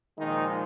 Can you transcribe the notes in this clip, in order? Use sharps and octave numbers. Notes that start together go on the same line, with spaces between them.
A#2 D#3 F3 G#3 D#4